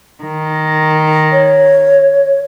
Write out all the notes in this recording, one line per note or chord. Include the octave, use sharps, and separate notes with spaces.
D#3
C#5